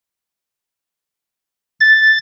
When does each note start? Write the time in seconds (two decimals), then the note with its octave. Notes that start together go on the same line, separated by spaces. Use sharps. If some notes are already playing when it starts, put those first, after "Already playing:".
1.80 A6